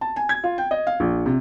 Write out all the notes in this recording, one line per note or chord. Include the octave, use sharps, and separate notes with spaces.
A5
G#5
G#6
F4
G5
D#5
F5
A#1
C3